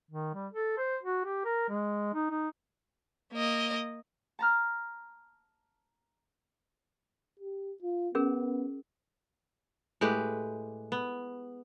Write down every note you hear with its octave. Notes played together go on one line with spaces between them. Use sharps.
D#3
G3
A4
C5
F#4
G4
A#4
G#3
D#4
D#4
A#3 D#5
A5 A#5 F6
G4
F4
B3 C#4 G#4 A#4
A2 G#3 G4 B4
B3